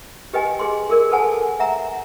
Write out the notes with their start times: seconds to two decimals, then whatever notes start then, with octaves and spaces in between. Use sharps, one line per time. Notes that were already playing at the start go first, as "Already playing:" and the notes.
0.33 G4 B4 D#5 G5 G#5
0.59 G#4 C6
0.90 G#4 A#4 D5
1.11 A4 B4 F#5 G#5 A5
1.60 E5 F#5 A#5